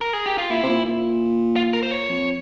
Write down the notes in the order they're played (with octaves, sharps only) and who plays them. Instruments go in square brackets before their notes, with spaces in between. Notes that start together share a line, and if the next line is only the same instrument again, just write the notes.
[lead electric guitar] A#4
G#4
G4
F4
[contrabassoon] A#2 [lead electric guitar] E4
[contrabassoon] C3
A#2
A#2
[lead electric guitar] F4
A#4
C5
C#5
[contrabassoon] F2